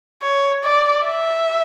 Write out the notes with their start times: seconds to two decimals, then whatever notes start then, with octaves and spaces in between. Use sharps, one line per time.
0.23 C#5
0.64 D5
1.06 E5